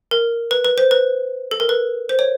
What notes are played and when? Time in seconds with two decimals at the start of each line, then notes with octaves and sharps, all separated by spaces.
0.11 A#4
0.51 B4
0.65 B4
0.78 C5
0.91 B4
1.51 A4
1.60 A#4
1.69 B4
2.09 C5
2.19 C#5